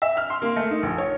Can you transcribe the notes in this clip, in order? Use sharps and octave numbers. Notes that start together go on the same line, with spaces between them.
E5
F6
C6
A#3
A3
D#4
A#1
C#5